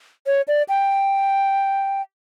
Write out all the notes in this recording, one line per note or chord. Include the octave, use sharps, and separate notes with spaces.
C#5
D5
G5